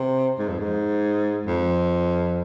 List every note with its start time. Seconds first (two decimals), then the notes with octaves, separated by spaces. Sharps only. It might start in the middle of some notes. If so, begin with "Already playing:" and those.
Already playing: C3
0.38 G#2
0.49 F2
0.59 G#2
1.46 F2